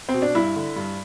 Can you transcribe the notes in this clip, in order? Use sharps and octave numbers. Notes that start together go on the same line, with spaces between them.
C4
B2
D4
G2 E4
D3
G2